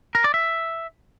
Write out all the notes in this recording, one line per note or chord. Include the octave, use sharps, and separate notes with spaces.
A#4
D5
E5